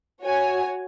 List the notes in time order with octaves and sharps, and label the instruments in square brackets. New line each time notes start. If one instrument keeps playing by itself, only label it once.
[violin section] F#4 C#5 G#5